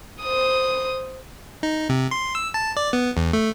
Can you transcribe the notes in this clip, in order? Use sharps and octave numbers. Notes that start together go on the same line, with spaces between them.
C5 D#6
D#4
C3
C6
E6
A5
D5
B3
E2
A3